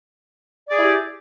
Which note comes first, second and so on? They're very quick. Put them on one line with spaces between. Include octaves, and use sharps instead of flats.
D5 G#4 E4 G4